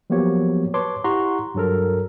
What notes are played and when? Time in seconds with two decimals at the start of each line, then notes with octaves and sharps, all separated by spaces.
0.10 F3 F#3 A#3 B3 G4 C#5
0.74 B4 C#5 A5 C6 D6
1.04 E4 G4 F#5 A#5 C6 C#6
1.54 G2 F#3 A4 A#4